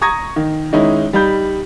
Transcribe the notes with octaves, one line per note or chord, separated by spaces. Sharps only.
A#5 C#6 D#6 G#6 A#6
D#3
D#3 G#3 C#4 D#4 E4
G3 D#4 B5 G6